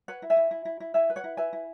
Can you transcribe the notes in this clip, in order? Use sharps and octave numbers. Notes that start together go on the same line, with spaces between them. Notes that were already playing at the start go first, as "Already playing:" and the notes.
B4 C#5 F#5
E4
E5 G#5
E4
E4
E4
E4
E4 E5 G#5
B4
C#5 F#5
E4
B4 E5 G#5
E4